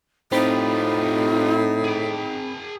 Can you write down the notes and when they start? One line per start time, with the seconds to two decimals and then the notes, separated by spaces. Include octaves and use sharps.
0.32 A2 C4 D#4 F4 G4 B5
1.84 G#4 G5